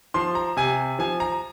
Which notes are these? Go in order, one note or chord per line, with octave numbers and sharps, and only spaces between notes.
F3 C6
A#5
C3 G#5
F3 G#5
A#5